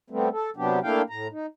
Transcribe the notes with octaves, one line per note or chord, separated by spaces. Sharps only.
G3 A3 B3 C4
A4
C3 F#3 B3 D4 G4
A3 A#3 D4 E4 F5 G5
A2 A#5
D#4